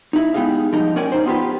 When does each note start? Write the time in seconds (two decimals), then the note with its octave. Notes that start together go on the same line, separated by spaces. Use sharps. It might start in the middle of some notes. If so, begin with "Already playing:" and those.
0.13 D#4 E4
0.34 G#3 B3 D#4 G4 G#4 F5
0.72 G#2 F3 G3 D#4
0.96 C#4 A#4 D5 G5 G#5
1.12 D#4 C5
1.25 B3 D#4 F4 G4 B4